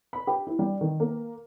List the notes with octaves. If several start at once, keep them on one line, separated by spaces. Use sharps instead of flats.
B5
G4
E4
G3
D#3
A#3